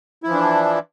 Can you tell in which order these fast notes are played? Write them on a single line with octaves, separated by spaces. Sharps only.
E4 F3 E3 D4